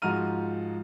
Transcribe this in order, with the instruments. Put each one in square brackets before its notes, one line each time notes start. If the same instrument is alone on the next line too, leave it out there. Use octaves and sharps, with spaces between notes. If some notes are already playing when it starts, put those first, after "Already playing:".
[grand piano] G#2 F3 F#4 A#5 F6 D#7